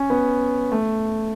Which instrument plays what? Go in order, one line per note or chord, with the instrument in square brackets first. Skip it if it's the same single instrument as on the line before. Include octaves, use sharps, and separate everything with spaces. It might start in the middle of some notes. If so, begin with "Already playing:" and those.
Already playing: [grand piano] C#4
B3
A3